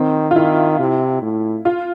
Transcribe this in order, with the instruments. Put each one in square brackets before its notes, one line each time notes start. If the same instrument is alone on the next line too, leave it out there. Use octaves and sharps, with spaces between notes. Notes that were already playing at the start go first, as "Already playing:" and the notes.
Already playing: [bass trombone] D#3 [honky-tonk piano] C4
[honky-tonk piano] F4
[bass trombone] D#3 [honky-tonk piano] E4
[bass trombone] C3
A2
[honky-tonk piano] F4